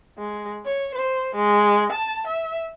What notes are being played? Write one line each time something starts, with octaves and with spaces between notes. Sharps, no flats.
G#3
C#5
C5
G#3
A5
E5